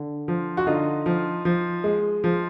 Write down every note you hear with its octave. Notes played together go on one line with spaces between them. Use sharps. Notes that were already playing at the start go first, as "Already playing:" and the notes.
Already playing: D3
F3
F#4
D3 D#4 F4
F3
F3
G#3
F3